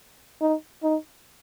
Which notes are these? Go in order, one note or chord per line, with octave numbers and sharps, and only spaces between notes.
D#4
D#4